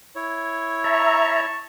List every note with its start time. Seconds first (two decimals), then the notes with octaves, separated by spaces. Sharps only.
0.15 E4 C#5
0.84 E5 A5 A#5 C#6